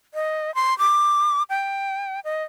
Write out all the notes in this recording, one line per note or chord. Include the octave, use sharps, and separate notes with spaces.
D#5
C6
D6
G5
D#5